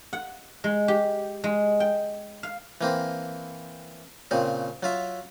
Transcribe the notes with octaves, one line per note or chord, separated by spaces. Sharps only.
F#5
G#3
G4
G#3
G5
F5
E3 A#3 C4
A#2 C#3 C4
F#3 F4 E5